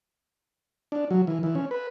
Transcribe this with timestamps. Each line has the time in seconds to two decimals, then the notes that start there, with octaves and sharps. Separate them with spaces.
0.92 D4
1.11 F#3
1.27 E3
1.43 E3
1.55 C#4
1.71 B4